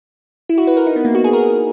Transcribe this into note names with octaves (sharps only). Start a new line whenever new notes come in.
E4
F#4
B4
A#4
D#4
B3
A#3
F#4
G#4
A#4